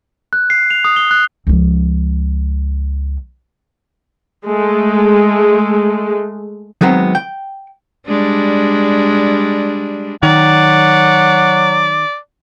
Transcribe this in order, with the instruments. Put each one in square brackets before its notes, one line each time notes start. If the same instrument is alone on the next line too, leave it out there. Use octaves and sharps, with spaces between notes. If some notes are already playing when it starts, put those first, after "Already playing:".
[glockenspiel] F#6
C7
F7
D#6
G7
F#6
[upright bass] C#2 F3
[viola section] G#3 A3
[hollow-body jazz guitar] D#3 F#3 G#3 B3 C4
G5
[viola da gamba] G3 G#3 D4
[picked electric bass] D#3 [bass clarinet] F#3 [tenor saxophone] D5 [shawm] F#5